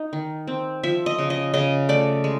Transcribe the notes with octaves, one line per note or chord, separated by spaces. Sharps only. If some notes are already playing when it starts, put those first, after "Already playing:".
Already playing: D#4
D#3
C4
F3 E5
D#5
C#3
D#5
C#3 D#5
A3 D5
G#3